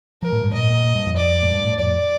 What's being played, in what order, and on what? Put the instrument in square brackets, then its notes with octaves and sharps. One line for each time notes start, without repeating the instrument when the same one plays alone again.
[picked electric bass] F3 [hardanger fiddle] A#4
[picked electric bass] A2
G2
[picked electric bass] A#2 [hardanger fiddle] D#5
[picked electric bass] A#2
A#2
G2
F2
[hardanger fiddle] D5
[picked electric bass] A2
G2
A2
[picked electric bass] F2 [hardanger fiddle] D5